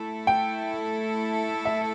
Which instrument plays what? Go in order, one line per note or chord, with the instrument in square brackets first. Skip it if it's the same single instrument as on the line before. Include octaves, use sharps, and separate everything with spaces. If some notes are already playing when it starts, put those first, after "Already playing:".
Already playing: [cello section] A3 E4 A4
[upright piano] G5
E5